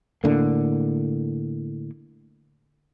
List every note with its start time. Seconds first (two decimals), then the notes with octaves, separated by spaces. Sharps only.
0.24 A2 D3 A#3